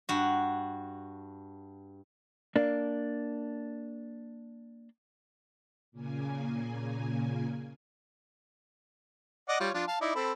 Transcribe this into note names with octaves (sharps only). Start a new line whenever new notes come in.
G2 F#4
A#3 D4
A#2 C#3 A#3 G#5
D5 D#5 F#5
G3 F4 C#5
F3 D4 F4
F5 A5
D#4 E4 D5
C4 A4 B5